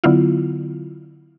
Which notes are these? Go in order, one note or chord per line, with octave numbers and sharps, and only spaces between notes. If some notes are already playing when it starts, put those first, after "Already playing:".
D3 F#3 B3 E4 F4